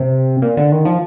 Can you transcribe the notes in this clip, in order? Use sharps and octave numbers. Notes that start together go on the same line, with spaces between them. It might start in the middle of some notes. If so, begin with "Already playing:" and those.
Already playing: C3
A#2
D3
D#3
F3